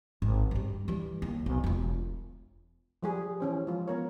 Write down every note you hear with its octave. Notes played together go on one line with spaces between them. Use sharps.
G#1
G2 G3
E3 G3
D#2
B1
E1 F4
F3 G3 G#4
E3 C#4 C5
F3 G#3 F4
B3 A#4 C#5